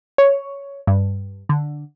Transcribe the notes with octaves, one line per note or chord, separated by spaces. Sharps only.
C#5
G2
D3